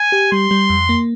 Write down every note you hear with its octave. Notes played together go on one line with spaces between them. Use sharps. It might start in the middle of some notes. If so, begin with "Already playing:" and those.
Already playing: G#5
G4
G3 C6
G3
F2
A#3